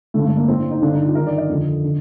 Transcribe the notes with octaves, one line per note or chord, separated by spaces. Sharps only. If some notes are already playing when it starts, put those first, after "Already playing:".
G2 D3 A3
A3
A#3
A2 C4
D4
D#4
G2 D3 D4
D#4
F4
G2 D#3 A#4
D5
D#5
F2 D3
D3